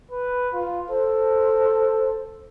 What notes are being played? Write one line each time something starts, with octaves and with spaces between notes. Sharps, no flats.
B4
F4
A4 C5